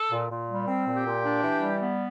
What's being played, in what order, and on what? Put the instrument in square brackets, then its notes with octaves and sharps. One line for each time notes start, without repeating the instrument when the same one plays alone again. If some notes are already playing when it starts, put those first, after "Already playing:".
Already playing: [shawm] A4
[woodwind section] A#2
A#2
G3
C4
A#2
[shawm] G4
[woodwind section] A#2
D4
E3
G3
B3